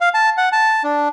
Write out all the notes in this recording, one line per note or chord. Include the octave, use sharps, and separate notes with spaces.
F5
A5
F#5
A5
D4